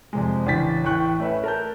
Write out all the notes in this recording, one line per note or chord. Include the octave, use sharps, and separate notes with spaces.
F2 C3 G#3
A1 C#3 D4 A6 B6
A1 A2 G5 C#6 F#6
A3 C#4 B4 E5
A#4 A5 G6